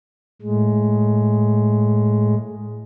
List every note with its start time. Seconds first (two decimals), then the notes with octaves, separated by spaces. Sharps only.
0.42 A2 G#3